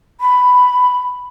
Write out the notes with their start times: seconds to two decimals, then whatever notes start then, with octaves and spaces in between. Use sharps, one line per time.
0.21 B5